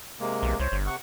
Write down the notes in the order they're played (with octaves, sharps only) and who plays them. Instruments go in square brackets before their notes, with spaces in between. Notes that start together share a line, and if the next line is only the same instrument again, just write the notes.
[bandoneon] C3 G#3 A#3
[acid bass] B1
[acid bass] C2 [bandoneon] C5 C#5
[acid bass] G1
[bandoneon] C3 F#5 C#6